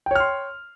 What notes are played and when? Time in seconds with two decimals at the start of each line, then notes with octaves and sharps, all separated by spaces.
0.06 G5
0.11 C#5
0.15 F6
0.20 C6